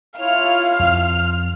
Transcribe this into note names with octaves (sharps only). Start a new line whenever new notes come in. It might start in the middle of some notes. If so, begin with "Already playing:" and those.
E4 F4 C#5 F5 F6
F2 F3 F4